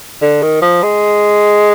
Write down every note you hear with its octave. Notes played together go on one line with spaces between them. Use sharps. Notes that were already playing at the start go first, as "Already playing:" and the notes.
D3
D#3
F3
G#3